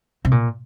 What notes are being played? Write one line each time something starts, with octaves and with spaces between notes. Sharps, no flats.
C3
A#2